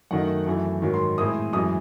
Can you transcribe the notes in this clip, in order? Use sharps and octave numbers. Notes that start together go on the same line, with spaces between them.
F#2 D#3 A3 D#4 F#5
F#2 E3 A3
G#2 D#3 F#3
C6
A2 G#3 C4 E4 D#6
F#2 E3 G#3 D#6